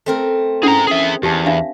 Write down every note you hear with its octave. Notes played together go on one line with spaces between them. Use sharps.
A3 C4 A#4
C#4 D4 E4 G#4 A#5
G#4 E5
E2 G4 A5
D4 E5 F5